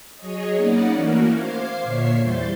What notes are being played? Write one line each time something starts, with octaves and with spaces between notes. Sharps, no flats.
F#3 G#4 C#5 D#5
A#3 B3 C#4 D#4 D5 F#5
E3 A3 A#3 C#4 F#4 A#4
C5 F5 D6 G#6 C7
A#2 D3 C#5 E5 C7
E2 E3 G3 C5 G6 A6